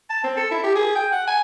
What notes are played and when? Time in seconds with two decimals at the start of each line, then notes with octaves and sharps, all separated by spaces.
0.10 A5
0.23 C4
0.37 A4
0.51 E4
0.64 G4
0.76 G#4
0.96 G5
1.12 F#5
1.28 G#5